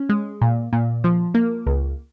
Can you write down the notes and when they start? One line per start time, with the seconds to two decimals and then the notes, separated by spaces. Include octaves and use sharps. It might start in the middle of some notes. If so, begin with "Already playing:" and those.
Already playing: C#4
0.09 G#3
0.41 A#2
0.73 A#2
1.04 F3
1.34 A#3
1.66 C#2